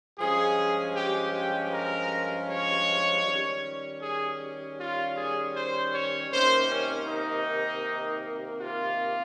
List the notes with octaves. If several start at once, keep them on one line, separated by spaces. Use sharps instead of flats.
G2 F3 G#3 C#4 G#4
G4
G4
A#4
C#5
D#3 G3 C#4
G#4
F4
G#4
C5
C#5
C3 D#3 A#3 C#4 C5
C#4
D#4
F4